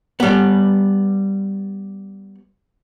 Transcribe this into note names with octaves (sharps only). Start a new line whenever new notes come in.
G3 B3